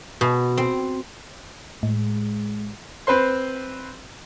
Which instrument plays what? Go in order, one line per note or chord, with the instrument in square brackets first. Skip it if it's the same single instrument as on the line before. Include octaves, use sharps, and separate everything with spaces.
[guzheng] B2
C4
[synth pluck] A2 [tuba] G#3
[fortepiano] C4 B4 C5 C6